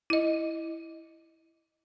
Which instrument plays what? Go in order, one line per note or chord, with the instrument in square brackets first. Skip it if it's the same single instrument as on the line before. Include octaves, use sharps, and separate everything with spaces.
[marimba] E4 D#5